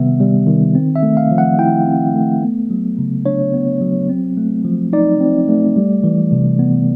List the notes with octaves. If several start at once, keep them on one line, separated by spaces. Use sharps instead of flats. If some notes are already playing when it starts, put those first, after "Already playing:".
Already playing: C3 D#3 G3 B3 E5
G3
D#3
C4
E5
A3
F5
F3
F#5
E4 G5
C4
A3
B3
F#3
C#3
D4 C#5
B3
F#3
C4
A3
F3
D#4 D5
C4
A3
G3
E3
C3
B3